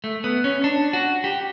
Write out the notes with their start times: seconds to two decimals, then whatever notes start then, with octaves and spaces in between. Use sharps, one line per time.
0.04 A3
0.24 B3
0.44 C#4
0.64 D4
0.93 F#4
1.24 G4